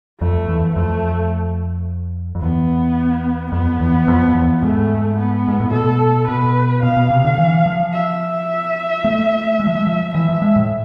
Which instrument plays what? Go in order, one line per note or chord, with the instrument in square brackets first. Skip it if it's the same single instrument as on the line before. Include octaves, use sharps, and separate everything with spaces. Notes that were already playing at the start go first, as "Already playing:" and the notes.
[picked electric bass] F2 [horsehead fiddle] A3
[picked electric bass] E2
[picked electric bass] F2 [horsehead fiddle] A3
[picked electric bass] F2
[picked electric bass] E2 [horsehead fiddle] B3
[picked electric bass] F2 [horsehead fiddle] B3
[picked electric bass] E2
F2
F2
E2
[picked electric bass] G#2 [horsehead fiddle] A3
[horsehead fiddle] B3
[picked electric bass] G#2
A2
[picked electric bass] B2 [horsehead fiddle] A4
[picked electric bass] B2 [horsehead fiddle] B4
[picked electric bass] B2 [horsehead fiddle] F5
[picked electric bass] B2
C3
D3
E3
F3
[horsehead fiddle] E5
[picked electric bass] A3
G#3
F3
G#3
F3
[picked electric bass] E3 [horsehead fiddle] E5
[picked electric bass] F3
G#3
A2